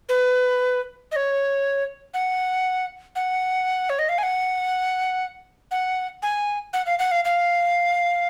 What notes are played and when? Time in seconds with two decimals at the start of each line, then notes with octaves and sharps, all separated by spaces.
0.09 B4
1.12 D#5
1.16 C#5
2.14 F#5
3.16 F#5
3.90 C#5
3.99 D#5
4.09 F5
4.18 G#5
4.23 F#5
5.71 F#5
6.23 G#5
6.73 F#5
6.86 F5
6.99 F#5
7.11 F5
7.25 F5